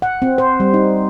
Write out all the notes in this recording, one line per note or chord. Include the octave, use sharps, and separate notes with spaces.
F#5
C4
C5
G3
D#4